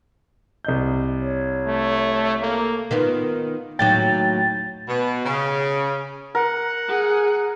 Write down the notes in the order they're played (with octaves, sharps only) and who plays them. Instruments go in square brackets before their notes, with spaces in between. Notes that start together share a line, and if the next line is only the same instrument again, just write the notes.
[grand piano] C2 D#5 G6
[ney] C#5
[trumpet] A3
[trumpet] A#3 [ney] A4
[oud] D#3 B3 F4
[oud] D#2 A2 F#3 [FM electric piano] G5 A6
[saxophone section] B2
C#3
[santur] A#4 [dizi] F#5
[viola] G#4